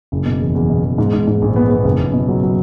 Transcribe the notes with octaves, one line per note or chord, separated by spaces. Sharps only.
F#1
B2
E2
E2
B2
E2
G#2
G#2
G#2
A#1
B3
B3
F#1
F#1
B2
F#3
F#3